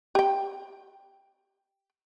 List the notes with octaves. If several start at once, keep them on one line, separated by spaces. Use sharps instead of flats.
G4 G5